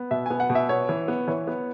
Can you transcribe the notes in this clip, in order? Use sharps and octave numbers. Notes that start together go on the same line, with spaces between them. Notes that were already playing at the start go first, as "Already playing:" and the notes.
Already playing: B3
B2 E5
B3 G#5
F#5
B2
E5
B3 C#5
E3
B3
E3 C#5
B3